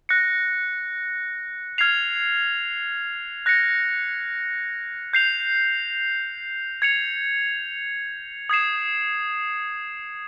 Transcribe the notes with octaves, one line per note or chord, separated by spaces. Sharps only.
F#6 A#6 C#7
F6 G#6 C7 F7
F#6 A#6 C#7
G6 C7 F7
G#6 C#7 F7
D#6 G#6 C7 E7